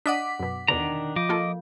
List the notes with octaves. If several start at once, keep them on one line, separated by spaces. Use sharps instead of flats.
D4 D#5 F#5 D6 B6 D#7
F#2 B2
E2 B2 D3 D#3 D4 A#5
F3 D#5 D6
A#3 F4 A4